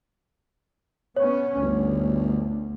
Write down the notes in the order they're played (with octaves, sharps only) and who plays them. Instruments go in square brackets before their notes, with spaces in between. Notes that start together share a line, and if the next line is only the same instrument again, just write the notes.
[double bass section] B3 C#4 [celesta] C#5
[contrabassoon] G1 [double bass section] D2